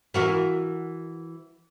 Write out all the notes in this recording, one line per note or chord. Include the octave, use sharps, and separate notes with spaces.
E3 F#4 A#4